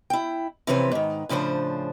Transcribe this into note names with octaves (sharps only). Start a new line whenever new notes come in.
E4 G5
C3 E3 F3 C4 C#4 B4
G#2 D#3
A2 C#3 F3 D4 C5